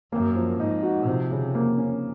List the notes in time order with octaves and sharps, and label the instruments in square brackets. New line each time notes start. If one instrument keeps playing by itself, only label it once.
[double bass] F#2 [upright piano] A#3
[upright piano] F3
[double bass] G#2 [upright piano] D#4
[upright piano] F#4
[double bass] C3 [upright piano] F3
[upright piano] C#3
A#3
C#4